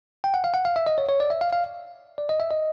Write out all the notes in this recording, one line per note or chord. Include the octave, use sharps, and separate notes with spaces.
G5
F#5
F5
F#5
F5
E5
D#5
C#5
C#5
D5
E5
F5
F5
D5
D#5
E5
D#5